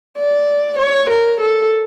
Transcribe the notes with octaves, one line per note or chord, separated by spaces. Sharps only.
D5
C#5
A#4
A4